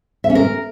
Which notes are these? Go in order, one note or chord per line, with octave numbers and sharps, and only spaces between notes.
E5
C#4
A#4